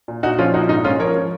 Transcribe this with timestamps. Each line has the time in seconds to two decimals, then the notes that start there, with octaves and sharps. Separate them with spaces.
0.08 A#2
0.23 A#2 D#4 F#4
0.38 F3 C#4 F4
0.54 A#2 D#4 F#4
0.69 G#2 D#4
0.84 G#2 C#4 F4
1.00 F3 A#4 C#5
1.15 F3